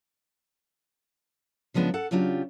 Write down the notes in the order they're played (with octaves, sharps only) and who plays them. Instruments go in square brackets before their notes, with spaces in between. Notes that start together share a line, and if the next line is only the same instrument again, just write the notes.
[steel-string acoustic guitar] C#3 F3 G#3 B3 D4
A4 F#5
C#3 F#3 D4 F4 G4